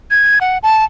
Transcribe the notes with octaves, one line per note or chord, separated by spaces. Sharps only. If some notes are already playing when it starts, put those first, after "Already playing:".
G#6
F#5
A5